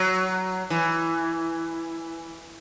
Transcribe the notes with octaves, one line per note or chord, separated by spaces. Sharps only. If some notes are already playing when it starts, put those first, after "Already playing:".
Already playing: F#3
E3